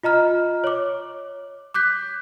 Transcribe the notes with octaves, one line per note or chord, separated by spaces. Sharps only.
F4 D#5 A#5 F6
C#5 D6
D6 F#6 G6 B6